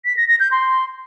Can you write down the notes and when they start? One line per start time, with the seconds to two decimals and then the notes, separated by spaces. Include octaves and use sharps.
0.05 B6
0.17 A#6
0.28 A#6
0.40 G6
0.51 C6